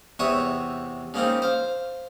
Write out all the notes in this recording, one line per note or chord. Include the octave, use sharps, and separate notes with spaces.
E2 C3 C#5 E5 C#6 D#6
C#3 A#3 C4 D#4
C5 F5